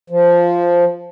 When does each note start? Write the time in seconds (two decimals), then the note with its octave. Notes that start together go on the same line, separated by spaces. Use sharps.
0.10 F3